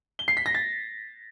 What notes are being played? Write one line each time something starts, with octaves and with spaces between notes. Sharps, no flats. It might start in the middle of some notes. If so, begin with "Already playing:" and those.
G7
C7
B6
A#6
A6